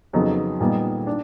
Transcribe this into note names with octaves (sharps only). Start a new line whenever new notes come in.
F2 C#3 F#3 B3 D#4
A#2 G3 B3 D#4 G#4
D4